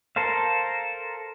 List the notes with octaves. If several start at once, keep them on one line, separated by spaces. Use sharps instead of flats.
A4 A#4 C5 F5